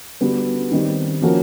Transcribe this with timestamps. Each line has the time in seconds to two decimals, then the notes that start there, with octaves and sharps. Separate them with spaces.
0.21 D3 G3 B3 D4 F#4
0.72 D#3 G3 C4
1.22 F3 A#3 C#4 F#4 A#4